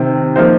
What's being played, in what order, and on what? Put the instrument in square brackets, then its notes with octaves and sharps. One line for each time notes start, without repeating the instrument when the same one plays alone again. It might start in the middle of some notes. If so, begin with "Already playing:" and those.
Already playing: [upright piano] C3 D#3 C4
F3 A#3 D#4 C5